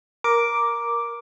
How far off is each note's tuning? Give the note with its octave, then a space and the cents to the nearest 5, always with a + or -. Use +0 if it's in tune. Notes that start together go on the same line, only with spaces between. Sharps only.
A#4 +5 D6 +0